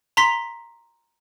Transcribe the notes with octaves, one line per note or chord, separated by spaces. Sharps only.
A#5 C6 B6